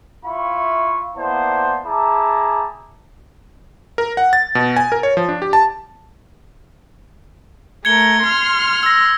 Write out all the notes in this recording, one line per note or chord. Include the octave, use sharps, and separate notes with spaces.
E4 F4 E5 B5 C#6
A#3 B3 E4 C5 D5 A5
E4 G#4 G5 A5 A#5 D6
A#4
F#5
A6
B2
G#5
A#4
C#5
F3
D4
G4
A5
A3 A#4 G#6 C#7 G7
C6 F6
E6 A#6